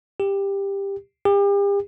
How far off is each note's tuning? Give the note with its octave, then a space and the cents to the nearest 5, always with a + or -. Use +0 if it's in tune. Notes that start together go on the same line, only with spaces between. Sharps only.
G4 +15
G4 +40